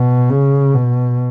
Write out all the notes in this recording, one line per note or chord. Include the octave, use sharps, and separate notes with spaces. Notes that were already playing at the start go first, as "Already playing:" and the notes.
Already playing: B2
C#3
B2